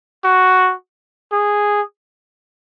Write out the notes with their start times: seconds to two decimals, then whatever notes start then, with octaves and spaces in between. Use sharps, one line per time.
0.24 F#4
1.32 G#4